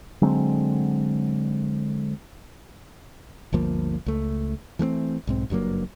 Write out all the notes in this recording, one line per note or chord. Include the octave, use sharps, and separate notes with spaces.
D3 F#3 G#3 C4
G1 D2 F3 A#3
C#2 A3
E3 A3 A#3 C4
B1 G#2 C4
F#1 G2 F#3 A#3